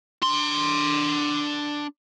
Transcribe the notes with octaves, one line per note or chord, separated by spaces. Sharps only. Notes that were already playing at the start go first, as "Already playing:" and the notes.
D4 C6